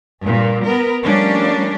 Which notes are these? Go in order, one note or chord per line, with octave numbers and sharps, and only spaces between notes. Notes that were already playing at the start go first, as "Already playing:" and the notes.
G2 A#2
B3 A#4
F3 G3 A3 A#3 C#4 D4